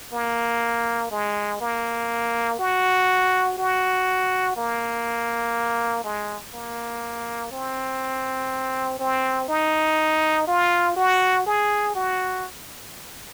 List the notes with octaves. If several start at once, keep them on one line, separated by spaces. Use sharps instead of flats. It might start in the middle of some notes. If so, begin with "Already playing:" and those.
A#3
G#3
A#3
F#4
F#4
A#3
G#3
A#3
C4
C4
D#4
F4
F#4
G#4
F#4